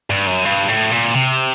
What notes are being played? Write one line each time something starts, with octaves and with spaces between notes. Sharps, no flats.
G2
F#2
G2
A2
A#2
C3